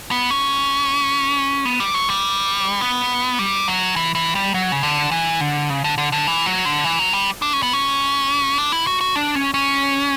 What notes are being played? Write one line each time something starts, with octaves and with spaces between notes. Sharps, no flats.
B3
C#4
B3
G3
F#3
G3
B3
G3
F#3
E3
E3
G3
F#3
C#3
D3
E3
D3
C#3
D3
D3
D3
E3
F#3
D3
E3
F#3
G3
D4
C#4
B3
C#4
D4
E4
F#4
F#4
D4
C#4
C#4